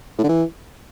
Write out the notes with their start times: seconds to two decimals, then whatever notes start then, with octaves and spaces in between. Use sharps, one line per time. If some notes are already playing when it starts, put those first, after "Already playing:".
0.18 A2
0.24 D3
0.29 E3